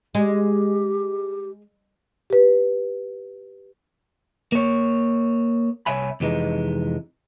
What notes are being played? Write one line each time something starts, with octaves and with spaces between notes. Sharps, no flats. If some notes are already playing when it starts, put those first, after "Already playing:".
G#3 G4
G4 B4
A#3 C#5
C2 C#5 E5 G#5 B5
F2 C3 E3 G#3 D#4